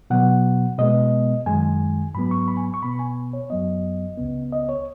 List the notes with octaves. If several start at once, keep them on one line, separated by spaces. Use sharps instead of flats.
B2 F#3 B3 F#5
B2 G#3 B3 D#5
F#2 D#3 G#3 G#5
G#2 F#3 B3 B5
C#6
B5
G#5
C#6
B2 B3 B5
G#5
C#5
F#2 F#3 B3 D#5
C#2 C#3 B3
D#5
C#5